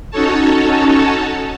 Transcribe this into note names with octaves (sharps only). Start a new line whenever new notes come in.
C#4 D#4 F#4 A4 C#5 A5